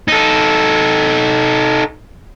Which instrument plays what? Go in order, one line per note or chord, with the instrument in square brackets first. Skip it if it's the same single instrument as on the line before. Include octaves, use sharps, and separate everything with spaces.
[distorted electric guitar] D#4 A4